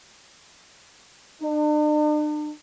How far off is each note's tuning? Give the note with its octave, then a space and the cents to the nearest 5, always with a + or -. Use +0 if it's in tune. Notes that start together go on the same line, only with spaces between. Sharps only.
D4 +45